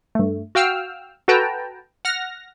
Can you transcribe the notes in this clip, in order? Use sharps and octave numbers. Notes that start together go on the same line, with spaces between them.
G2 A3
F#4 F5 G5 E6 F6
F#4 A4 B4 G5 A5 A#5
F#5 F6 A#6